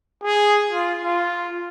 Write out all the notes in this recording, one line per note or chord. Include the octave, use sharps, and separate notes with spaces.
G#4
F4
F4